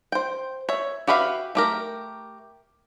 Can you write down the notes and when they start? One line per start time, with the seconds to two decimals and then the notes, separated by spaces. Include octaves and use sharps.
0.12 C5 G5
0.69 C#5 E5
1.07 F#4 G4 B4 E5 F5
1.55 A3 G4 A#4